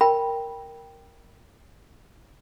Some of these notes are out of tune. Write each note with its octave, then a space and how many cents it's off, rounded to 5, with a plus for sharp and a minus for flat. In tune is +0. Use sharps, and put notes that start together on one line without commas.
A#4 +0 G5 +0 B5 -20